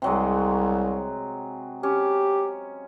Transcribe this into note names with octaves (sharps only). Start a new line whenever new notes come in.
C2 C3 F#3 G#3
C#4 G4